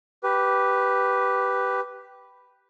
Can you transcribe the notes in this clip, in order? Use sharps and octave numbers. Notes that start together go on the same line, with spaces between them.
G4 B4